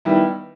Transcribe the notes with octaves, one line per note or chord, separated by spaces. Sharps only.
D#3 G3 B3 E4